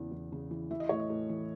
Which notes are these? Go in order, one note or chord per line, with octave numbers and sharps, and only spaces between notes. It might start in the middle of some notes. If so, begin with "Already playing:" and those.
Already playing: E2 C#3 E3
E2
C#3
E3
E3 E5
D#5
A2 C#5
D#5
A2
E3